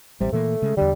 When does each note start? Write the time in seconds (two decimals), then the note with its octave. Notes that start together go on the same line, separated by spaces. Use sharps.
0.21 A1 C3 G3
0.32 A#2 E3 A3 A#3
0.62 C#3 G#3
0.77 E2 D3 G3